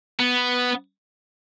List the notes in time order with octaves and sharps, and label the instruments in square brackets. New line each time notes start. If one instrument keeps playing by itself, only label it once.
[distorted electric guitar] B3